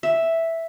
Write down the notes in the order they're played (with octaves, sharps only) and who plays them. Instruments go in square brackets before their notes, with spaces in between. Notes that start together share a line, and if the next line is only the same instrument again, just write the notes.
[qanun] E5